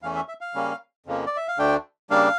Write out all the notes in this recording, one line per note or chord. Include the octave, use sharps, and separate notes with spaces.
E2 E3 A3 C#4 F5
E5
E5
F5
C#3 G3 A#3 C#4
F2 C#3 F3 A#3
D5
E5
F5
D2 D3 A3 D4 G5
C#3 G3 A#3 D4 F5